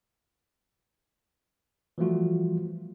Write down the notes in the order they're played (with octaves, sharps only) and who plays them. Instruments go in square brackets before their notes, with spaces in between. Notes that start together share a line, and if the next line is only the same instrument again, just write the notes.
[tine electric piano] E3 F3 G3 A3 F4 F#4